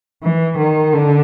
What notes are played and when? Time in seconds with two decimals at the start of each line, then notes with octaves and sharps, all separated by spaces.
0.23 E3
0.58 D#3
0.93 D3